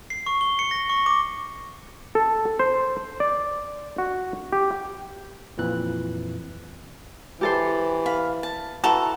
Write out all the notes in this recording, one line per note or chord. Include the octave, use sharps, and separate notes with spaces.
C7
C#6
G7
C#7
A#6
C#6
D6
A4
C5
D5
F#4
G4
F2 A#2 E3 F#6
E3 G4 A4 C5
F5 B5
A5
E3 F#4 A4 A#5 C#6